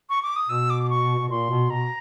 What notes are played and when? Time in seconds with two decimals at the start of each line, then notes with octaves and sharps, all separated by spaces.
0.10 C#6
0.23 D6
0.36 D#6
0.49 B2 E6
0.70 D6
0.83 D6
0.90 C#6
1.19 B2
1.30 A#2 C6
1.50 B2
1.70 B2 A#5